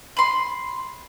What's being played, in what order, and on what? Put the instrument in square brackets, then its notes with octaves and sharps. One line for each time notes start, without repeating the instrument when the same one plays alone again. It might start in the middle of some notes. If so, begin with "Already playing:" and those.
[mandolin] B5 C6